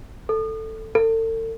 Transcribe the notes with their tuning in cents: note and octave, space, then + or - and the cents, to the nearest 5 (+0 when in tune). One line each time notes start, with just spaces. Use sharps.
A4 +5
A4 +40